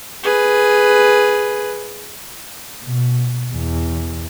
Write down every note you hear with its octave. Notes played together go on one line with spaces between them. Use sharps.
G#4 B4
B2
E2